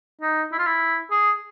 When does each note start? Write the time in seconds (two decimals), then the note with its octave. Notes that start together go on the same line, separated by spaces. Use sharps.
0.21 D#4
0.52 E4
0.59 F4
0.66 E4
1.11 G#4